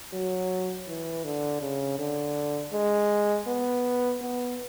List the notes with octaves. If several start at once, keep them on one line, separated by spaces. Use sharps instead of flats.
F#3
E3
D3
C#3
D3
G#3
B3
B3